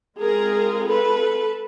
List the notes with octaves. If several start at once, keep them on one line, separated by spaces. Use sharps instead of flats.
G#3 C4 F4 G#4 A#4
A4 B4